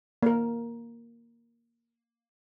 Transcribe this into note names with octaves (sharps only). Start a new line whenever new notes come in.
A#3 A#4